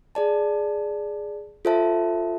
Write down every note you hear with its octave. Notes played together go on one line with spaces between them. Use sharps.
G#4 D5 A5
F4 A4 C5 E5 A5